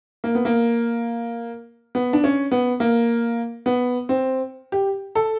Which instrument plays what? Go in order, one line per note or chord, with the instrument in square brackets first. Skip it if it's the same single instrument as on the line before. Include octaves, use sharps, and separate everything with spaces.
[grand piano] A#3
B3
A#3
B3
D4
C#4
B3
A#3
B3
C4
G4
A4